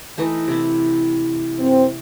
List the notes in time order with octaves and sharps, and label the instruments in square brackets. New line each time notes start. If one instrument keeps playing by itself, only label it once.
[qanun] E3 A3 D#4
C3 E4
[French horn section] F#2 C4